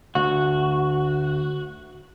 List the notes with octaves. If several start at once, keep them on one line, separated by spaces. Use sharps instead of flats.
D2 F#4